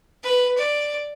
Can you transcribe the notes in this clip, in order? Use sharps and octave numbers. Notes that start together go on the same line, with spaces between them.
B4
D5